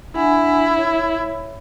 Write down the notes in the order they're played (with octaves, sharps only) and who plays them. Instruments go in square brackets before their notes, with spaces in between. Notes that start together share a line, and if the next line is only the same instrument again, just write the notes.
[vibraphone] D4 F#5 G#5 [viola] E4
[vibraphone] C#5